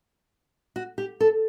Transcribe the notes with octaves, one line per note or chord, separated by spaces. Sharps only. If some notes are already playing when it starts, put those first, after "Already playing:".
F#4
G4
A4